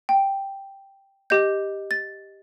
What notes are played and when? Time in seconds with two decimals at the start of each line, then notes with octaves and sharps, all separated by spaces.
0.09 G5
1.30 G4 D#5 G6
1.91 A6